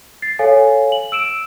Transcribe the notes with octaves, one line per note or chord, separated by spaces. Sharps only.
A6 C7
A4 C#5 F5 G#5
F#7
E6 D7 E7